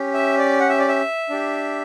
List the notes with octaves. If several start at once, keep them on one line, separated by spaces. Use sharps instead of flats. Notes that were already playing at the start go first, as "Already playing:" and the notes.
Already playing: C#4 G4
E5
D5
F#5
E5
D5
E5
D4 G4